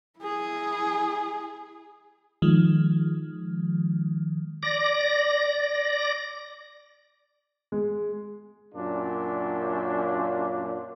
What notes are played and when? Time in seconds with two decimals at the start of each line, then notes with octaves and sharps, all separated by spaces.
0.20 E4 G#4
2.42 D#3 F3 G#3
4.63 D5 A#6
7.72 G#3
8.75 F#2 A#2 D4 F4